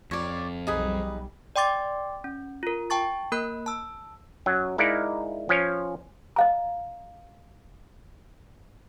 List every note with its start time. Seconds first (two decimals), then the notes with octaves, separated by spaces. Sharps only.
0.11 F2 C#5 D5
0.67 B1 G3 D#4 G#4 B4
1.56 D5 G5 C6 D6 A6
2.24 C#4
2.63 F4 A#4
2.90 G5 A5 C#6 A6
3.32 A#3 A#4 B5 F#6
3.66 A5 E6
4.46 F#2 F#3
4.78 G#3 D#4 E4 A#4 D5 F5
5.49 F3 C#4 C#5
6.36 D#5 F5 A#5